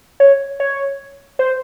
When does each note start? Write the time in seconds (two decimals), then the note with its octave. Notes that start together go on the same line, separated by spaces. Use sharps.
0.20 C#5
0.60 C#5
1.39 C5